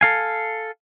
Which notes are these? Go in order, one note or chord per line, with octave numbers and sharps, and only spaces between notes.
A4 F5 G#5